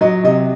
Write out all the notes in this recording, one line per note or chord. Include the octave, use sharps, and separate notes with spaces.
F#3 D#5
C3 D#5